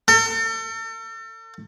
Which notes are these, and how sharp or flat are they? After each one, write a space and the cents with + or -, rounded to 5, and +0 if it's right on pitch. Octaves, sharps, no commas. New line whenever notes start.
A4 +40